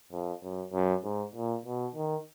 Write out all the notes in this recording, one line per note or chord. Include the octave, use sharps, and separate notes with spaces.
F2
F#2
F#2
G#2
A#2
B2
D#3